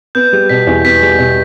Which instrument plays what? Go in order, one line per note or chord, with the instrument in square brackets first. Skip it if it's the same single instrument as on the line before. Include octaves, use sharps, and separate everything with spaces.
[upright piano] B3 [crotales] G6
[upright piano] G3
[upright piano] B2 [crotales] B6
[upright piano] E2
[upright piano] B3 [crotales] B6
[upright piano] G3
B2